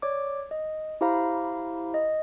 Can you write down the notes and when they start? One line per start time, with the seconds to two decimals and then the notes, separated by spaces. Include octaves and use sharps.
0.02 C#5 D5 D6
0.51 D#5
1.01 E4 G4 C5 F5 A#5 B5
1.94 D#5